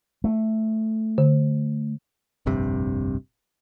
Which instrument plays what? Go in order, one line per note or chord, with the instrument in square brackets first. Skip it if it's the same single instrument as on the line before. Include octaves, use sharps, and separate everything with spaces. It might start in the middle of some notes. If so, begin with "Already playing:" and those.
[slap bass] A3
[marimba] D3
[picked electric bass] F1 A#1 G2 C3